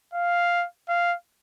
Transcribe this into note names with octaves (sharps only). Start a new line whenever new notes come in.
F5
F5